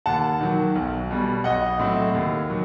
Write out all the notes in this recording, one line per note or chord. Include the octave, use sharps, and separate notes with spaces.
D#2 F#5 A5
D#3 F#3
B1
B2 G3
B1 D#5 F#5
A2 F#3 A3 C4
D#2
D#3 F#3